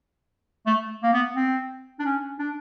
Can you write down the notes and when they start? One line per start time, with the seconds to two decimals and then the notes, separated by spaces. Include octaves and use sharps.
0.66 A3
1.03 A#3
1.13 B3
1.36 C4
1.99 D4
2.05 C#4
2.39 D4